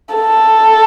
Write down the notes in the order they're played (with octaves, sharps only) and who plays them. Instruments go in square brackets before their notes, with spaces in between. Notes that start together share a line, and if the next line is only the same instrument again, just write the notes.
[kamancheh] A4